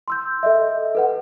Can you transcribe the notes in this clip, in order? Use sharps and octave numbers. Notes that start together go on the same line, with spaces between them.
C6 E6 G6
A4 D#5 E5
A4 B4 F#5